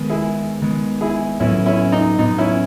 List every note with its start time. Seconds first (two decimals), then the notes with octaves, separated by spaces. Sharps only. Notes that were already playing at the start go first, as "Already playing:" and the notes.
Already playing: D#3 G#3 B3
0.09 E4 G#4
0.62 D#3 G#3 B3
1.01 E4 G#4
1.40 A2 F#3 B3 C#4 E4
1.66 C#4 E4
1.92 D#4
2.19 A2 F#3 B3 D#4
2.38 C#4 E4